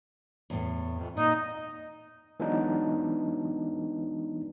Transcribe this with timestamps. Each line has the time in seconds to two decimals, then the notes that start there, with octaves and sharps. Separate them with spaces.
0.50 E2 A2 A3
0.94 F2 C3
1.17 A#2 D#4 D#5
2.40 E3 F#3 G#3 B3 D4 D#4